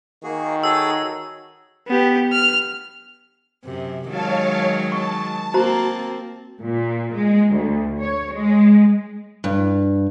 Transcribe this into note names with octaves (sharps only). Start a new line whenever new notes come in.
D#3 A#3 F#4 G#4
D#4 F#4 G#4 A4 C#5 E6
B3 G4
F6
F#2 C3
D#3 F#3 G#3 C#5 F5 A5
A5 C#6
A#3 C4 F#4 C5 A#5
A#2
G#3
D2
C#5
G#3
G2